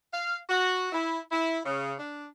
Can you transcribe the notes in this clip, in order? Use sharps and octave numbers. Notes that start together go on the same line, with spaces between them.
F5
F#4
E4
E4
C#3
D4